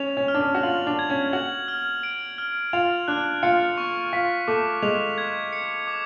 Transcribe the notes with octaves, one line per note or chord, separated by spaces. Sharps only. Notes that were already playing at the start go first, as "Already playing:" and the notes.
Already playing: C#4 F7
C#4
F6
D4
C#4
F#4
F4 F#7
D4
G#6
C#4
F#4 F#7
F6
D7
F6
F4 F7
D4 F#6
F4 C#7
C#6
F4 B6
A3 D6
G#3 F7
G#6
C#7
D6